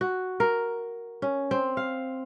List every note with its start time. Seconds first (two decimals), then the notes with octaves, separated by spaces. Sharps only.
0.01 F#4
0.40 A#4
1.22 C#4
1.51 C4
1.77 F5